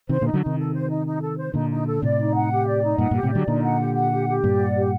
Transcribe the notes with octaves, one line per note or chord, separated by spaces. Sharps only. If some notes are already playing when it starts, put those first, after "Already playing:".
C3 D#3 C5
A#2 D3 D#4
D3 F#3
C3 D#3 D#4
A4
C5
D#4
D#4
A4
C5
A#2 D3 D#4
D#4
A4
A2 C3 D5
D#4
F#5
G4
D5
D#4
G2 A#2 F#5
G2 A#2 G4
A2 C3
D3 F#3 D5
A#2 D3 D#4
F#5
G4
F#5
G4
G4
G2 A#2 D5
F#5
G4